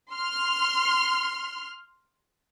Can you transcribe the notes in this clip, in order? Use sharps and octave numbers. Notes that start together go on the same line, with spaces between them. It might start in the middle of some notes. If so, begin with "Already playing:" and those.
C6 F6